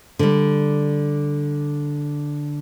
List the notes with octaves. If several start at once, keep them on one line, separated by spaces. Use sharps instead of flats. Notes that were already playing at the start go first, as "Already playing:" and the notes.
D3 G3